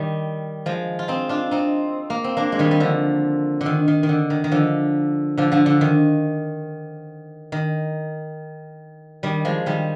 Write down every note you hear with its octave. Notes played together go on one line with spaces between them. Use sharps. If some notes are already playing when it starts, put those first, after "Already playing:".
Already playing: D#3 G3
F3 G#3
F4
C4 D#4
D4 F4
C4 D#4
A#3
C4
A#3 D4
G#3
D#3 G3
G3
D3 F3
D3
D#3
D#3
D#3
D3
D#3
D#3
D3 F3
D3 F3
D3 F3
D3
D#3
D#3
D#3 G3
F3 G#3
D#3 G3